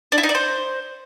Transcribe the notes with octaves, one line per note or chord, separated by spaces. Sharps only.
D4
E4
D#4
D5
C5